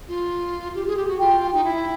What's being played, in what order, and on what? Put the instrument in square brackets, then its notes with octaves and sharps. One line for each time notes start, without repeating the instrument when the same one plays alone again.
[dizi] F4
G4
G#4
G4
F#4
[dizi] F4 [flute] G5
[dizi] D#4
E4